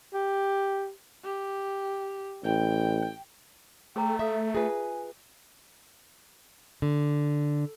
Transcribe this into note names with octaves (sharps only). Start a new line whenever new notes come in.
G4
G4
A1 G5
A3 G#4 C5 G5 A#5
A4 E5 F5 D#6
F4 G#4 B4 E5 G#5
D3